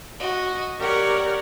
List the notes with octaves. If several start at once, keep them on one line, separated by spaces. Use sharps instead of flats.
F#4 D#5
G4 A#4 C#5 D5 F#5